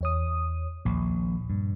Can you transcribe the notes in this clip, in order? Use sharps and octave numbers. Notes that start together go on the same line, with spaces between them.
E2 C#5 D#6
A#1 D#2 A#2
G2